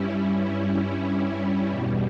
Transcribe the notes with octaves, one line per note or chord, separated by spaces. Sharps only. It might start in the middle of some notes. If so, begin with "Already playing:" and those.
Already playing: G2 G3 C#4 E4
E2 B2 G3